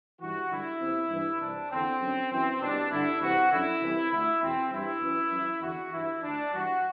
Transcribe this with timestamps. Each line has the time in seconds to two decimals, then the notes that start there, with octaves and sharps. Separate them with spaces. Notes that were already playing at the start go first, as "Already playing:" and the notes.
0.21 G2 E3 F#4
0.51 G2 D3 E4
0.81 E2 C3 E3
1.11 G2 E3
1.41 C2 C3 E3 D4
1.71 E2 D3 C4
2.02 F#2 D3
2.31 F#2 E3 C4
2.61 C2 B2 D4
2.91 G2 D3 E4
3.21 C2 C3 E3 F#4
3.52 F#2 D3 E4
3.82 C2 C3 E3
4.11 D2 D3 E4
4.42 E2 B2 C4
4.72 G2 E3 E4
5.02 F#2 E3
5.32 F#2 E3
5.62 E2 D3 F#4
5.92 G2 E3 E4
6.22 D2 D3 D4
6.53 G2 E3 F#4